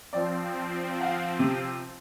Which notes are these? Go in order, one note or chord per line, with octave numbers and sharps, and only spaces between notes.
F3 C4 D5
F5 F#5
C3